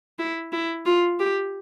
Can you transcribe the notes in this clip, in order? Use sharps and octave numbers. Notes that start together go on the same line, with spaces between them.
E4
E4
F4
G4